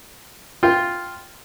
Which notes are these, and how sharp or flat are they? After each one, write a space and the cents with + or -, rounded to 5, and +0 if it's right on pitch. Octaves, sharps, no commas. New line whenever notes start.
F4 +0 G5 +0